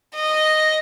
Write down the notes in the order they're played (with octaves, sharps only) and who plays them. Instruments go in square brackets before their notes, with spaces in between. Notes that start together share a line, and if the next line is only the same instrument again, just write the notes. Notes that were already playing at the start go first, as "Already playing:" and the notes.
[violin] D#5